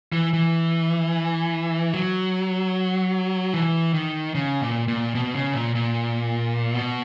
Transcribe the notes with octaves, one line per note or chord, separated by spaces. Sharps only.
E3
E3
F#3
E3
D#3
C#3
A#2
A#2
B2
C#3
A#2
A#2
B2